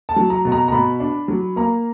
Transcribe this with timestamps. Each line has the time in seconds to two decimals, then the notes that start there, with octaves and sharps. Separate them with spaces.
0.09 A5
0.16 F#3
0.30 A#5
0.45 B2
0.52 A#5
0.68 A#5
0.72 B2 B5
1.00 D4
1.28 F#3
1.56 A#3 A#5